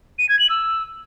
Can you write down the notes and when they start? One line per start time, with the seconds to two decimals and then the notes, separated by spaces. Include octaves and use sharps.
0.19 D#7
0.29 G#6
0.39 F#7
0.50 E6